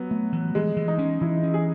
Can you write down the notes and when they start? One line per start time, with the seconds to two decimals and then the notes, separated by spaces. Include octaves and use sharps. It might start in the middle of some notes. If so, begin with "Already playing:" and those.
Already playing: F#3 B3
0.11 A3
0.33 E3
0.55 E3 G#3
0.76 E3
0.88 D#4
0.98 C#4
1.21 E3 E4
1.43 C#4
1.54 G#4